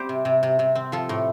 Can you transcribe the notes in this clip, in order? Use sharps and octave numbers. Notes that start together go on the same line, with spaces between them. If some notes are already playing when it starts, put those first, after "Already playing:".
Already playing: G3 C4 G4 C5
C3
C3
C3
C3
C4
F3 F4 A4
A2